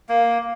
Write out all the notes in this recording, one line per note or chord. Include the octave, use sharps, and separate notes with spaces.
A#3